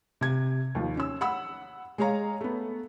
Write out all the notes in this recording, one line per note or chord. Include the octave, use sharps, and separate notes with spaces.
C3 G#6
D#2 F3
C#4 E6
F#5 B5 E6
G#3 G#4 C#5 F5 A#5
A3 B3